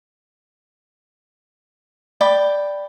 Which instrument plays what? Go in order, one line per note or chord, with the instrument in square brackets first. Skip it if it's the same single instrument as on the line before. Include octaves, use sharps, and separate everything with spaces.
[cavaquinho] D5 G5 B5 D6